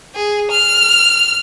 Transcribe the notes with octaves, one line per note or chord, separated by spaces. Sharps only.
G#4
F6